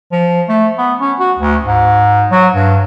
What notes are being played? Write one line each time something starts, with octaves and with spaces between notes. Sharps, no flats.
F3
A3
B3
C#4
F#4
D2
G#2
F#3
G2